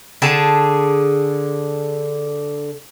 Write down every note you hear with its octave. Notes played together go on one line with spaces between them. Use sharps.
D3 G#4 A5